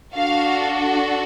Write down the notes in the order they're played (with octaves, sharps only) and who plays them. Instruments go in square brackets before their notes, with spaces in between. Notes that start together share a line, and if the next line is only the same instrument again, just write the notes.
[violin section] D4 F#4 A4 F5